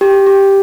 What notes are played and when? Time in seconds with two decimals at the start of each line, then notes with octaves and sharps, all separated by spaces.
0.01 G4
0.27 G4